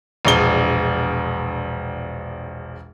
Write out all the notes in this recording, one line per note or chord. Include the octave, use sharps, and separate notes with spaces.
E1 A#1 G7